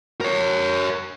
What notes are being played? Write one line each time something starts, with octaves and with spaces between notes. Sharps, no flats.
A#4 C#5